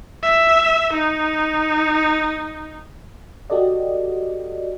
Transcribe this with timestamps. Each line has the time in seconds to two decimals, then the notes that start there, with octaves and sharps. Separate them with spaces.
0.23 E5
0.94 D#4
3.50 F#4 G4 A4 D5 D#5